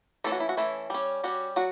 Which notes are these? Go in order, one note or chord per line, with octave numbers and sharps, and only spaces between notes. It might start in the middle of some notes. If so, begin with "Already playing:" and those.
E3 A3 C#4 A4
F#4
E4
F#4
E3 A3 C#4 E4
G3 C#4
G3 C#4 F#4
F#3 F#4